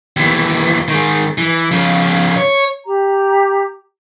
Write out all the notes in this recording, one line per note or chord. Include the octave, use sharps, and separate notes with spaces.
D#2 E3
D#3 G#3
E3
C#3 F3
C#5
G4 A#5